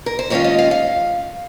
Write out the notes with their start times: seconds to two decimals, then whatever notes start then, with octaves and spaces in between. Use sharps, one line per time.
0.06 A#4
0.19 C5
0.30 D#2 D#3 G#3 C#4 F4 C#5
0.44 D#5
0.59 F5
0.71 F5